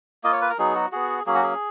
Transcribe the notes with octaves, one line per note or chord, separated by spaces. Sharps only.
A#3 F4 D#5
C#5
B4
A#4
F#3 B3 D#4 G#4
F#4
B3 F#4 G#4
F#3 A#3 C#4 G#4
F#4
G#4